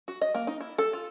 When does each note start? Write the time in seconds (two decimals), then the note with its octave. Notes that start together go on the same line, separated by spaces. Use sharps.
0.08 F#4
0.21 D#5
0.34 A#3
0.47 D#4
0.61 E4
0.78 A4
0.93 F4